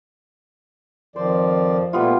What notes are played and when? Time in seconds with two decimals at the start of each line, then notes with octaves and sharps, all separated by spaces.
1.16 F2 D#3 F3 C5 D5
1.93 A#2 G3 A3 B3 F4